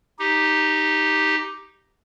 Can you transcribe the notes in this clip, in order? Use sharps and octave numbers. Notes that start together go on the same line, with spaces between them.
D#4 G4